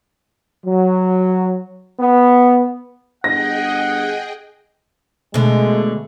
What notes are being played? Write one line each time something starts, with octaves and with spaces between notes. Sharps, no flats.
F#3
B3
G1 G#4 D#5 F#5 G5 A#6
B2 D3 G#3 A3